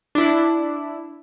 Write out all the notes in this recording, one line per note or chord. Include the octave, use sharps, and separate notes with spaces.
D4 E4